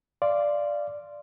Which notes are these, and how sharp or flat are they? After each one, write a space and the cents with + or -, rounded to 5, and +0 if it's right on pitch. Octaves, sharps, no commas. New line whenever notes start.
D5 +0 F5 -20 C6 +0